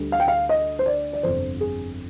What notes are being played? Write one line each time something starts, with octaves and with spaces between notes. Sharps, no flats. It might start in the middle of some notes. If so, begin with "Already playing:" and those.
Already playing: D2 D3 G3
F5
G5
F5
D#5
C5
D5
D5
G1 F2 C3 F3 C5
G#4